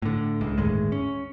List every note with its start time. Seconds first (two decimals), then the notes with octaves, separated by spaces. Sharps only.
0.02 A2 D3
0.41 C#2
0.58 G1 D#2 A2 G#3
0.92 C#4